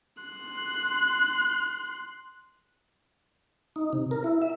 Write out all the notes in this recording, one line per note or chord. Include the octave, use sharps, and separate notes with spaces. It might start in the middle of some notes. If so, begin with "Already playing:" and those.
C6 F#6
D#4
C3
A#4
E4
E5